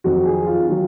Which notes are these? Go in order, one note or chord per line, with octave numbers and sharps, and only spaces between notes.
F2 D#3 F#3 F#4
G#4
F4
D#3 F#3 F4